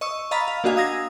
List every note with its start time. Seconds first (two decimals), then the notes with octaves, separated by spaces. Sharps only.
0.01 D#5 C#6 E6
0.31 D#5 F5 A#5 B5 A6 B6
0.48 F5
0.64 A#3 D4 F#4 D#5 F5 G#5
0.77 D#6 E6 G#6 A#6